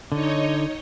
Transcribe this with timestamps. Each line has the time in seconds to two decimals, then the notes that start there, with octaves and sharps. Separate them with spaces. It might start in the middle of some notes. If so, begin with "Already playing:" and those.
0.12 D3 D#4 C#5 D#5